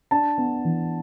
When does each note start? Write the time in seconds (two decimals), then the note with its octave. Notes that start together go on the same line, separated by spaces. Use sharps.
0.11 D4 A5
0.38 B3
0.65 E3